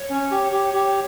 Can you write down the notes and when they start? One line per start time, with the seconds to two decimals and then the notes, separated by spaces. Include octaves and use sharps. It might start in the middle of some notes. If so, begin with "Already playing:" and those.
Already playing: C#5
0.10 C#4
0.31 G4
0.52 G4
0.74 G4